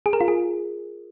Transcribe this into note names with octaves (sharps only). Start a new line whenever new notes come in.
G#4
A#4
F4
G#4